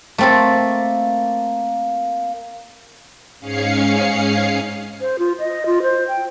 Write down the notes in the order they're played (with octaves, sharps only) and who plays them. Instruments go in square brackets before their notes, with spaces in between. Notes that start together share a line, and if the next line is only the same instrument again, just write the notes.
[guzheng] A3 C4 A4 [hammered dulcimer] A#3
[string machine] G#2 C#4 G#4 F5 C7 C#7
[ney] C5
F4
D#5
F4
C5
G5